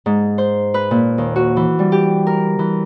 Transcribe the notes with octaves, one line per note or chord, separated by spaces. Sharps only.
G#2
C5
B4
A#2
D#2
F#4
E3
G3
G4
A#4
E3